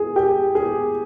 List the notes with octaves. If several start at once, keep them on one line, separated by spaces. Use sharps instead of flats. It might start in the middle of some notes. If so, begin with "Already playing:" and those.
Already playing: G#4
G4
G#4